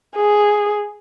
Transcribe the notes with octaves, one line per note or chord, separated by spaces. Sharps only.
G#4